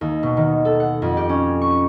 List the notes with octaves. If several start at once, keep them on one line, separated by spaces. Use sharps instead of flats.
D#2
B2
D#3
A4
F#5
F2
G4
C#4
C#6